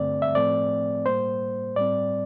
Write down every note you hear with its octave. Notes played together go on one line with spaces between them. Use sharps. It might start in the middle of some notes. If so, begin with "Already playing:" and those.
Already playing: G2 D3 A3 C4 D5
E5
A2 F3 A3 C4 D5
A2 G3 A#3 C5
A2 G3 C4 D5